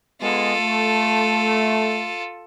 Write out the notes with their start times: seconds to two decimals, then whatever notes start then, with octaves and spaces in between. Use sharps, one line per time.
0.21 G#3 B3 F4 A4
0.60 A3